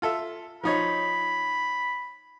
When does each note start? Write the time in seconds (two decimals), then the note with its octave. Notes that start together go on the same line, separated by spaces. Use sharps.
0.02 F4 A4 E5
0.63 F3 D#4 C#5 B5